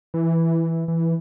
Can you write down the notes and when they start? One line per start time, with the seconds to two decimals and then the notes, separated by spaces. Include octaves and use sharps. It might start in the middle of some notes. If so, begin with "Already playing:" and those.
0.14 E3
0.88 E3